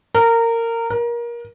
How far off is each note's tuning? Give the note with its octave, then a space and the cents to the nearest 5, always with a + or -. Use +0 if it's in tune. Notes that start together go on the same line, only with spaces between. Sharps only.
A#4 -20
A#4 +25